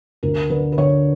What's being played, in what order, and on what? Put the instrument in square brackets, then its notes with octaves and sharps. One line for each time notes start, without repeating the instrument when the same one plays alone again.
[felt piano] D2 A#4
D3 B4
B4
D3 C#5